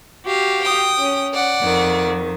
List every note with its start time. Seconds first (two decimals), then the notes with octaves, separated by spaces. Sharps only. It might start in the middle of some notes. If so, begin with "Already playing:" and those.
0.25 F#4 G4 F5
0.62 G5 D#6
0.99 C#4
1.33 D5 F#5
1.62 F2 D#3